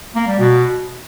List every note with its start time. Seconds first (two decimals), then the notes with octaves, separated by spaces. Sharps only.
0.16 A#3
0.27 G3
0.39 B2